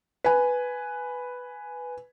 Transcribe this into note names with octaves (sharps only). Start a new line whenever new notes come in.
B4 G#5